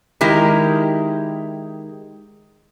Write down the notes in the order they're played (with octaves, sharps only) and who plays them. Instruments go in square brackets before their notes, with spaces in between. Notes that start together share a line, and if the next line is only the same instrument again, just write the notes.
[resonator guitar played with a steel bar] D#3 G#3 E4 G4 A#4